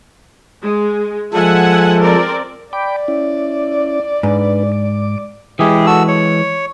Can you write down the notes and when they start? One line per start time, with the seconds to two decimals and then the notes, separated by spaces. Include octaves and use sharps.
0.62 G#3
1.34 F3 G#3 A4 E5 F#5 G#5
1.99 C4 A#4 D5
2.73 D5 G5 B5 D6
3.08 C#4 E4
4.23 G#2 D4 B4
4.72 D6
5.59 E3 G#3 E4 G4 G#4
5.86 F#4 A4 E6
6.08 C#5